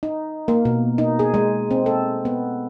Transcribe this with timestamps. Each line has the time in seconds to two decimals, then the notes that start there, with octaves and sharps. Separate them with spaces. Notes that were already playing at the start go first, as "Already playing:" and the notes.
0.03 D#4
0.48 A#3
0.65 B2
0.98 D#4
1.19 G#4
1.34 G#3
1.71 C4
1.86 A4
2.25 B3